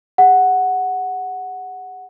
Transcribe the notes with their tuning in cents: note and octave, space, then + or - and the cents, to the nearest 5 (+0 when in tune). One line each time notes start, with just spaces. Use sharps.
G#4 -45 F#5 +0